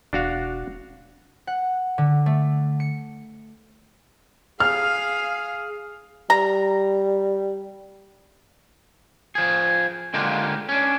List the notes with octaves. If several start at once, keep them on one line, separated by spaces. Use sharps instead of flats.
E1 D4 F#4 F5
F#5
D3
A3
C#7
G#4 F5 F6
G3 A#5
F3 G#4
D3 G#3 A#3 D4 F4 G4
C#4 D4